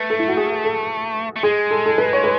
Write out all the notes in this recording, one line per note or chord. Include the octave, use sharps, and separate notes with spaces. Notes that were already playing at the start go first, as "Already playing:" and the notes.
Already playing: A3 B4
A4
E4
F#4
G#4
A4
A3
G#3 G#4
A4
A4
B4
C#5
B4